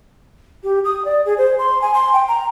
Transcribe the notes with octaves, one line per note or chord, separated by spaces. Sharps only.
G4
D#6
D5
G#4
C5
C6
G#5
C6
G5
A#5